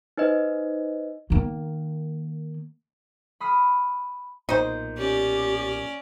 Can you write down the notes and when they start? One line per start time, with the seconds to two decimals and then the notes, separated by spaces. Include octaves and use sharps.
0.17 D#4 B4 C5 D#5
1.30 D#3 A#3
3.40 B5 D#6 F6 C7
4.49 B1 A#2 D#4 C5
4.98 C#4 G4 D5